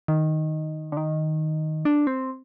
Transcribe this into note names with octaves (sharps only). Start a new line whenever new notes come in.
D#3
D3
D#3
D4
C4